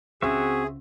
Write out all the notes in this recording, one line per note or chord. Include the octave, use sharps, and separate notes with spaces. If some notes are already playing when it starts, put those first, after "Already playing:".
C#2 C#3 C4 F#4 G#4 E5